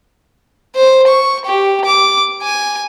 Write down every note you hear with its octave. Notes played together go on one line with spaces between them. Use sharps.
C5
C#6
G4
D6
G#5